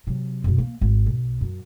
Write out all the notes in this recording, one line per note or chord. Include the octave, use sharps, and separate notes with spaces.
C3 F#3
F#2 B2
A#3
G#1
B1
F#2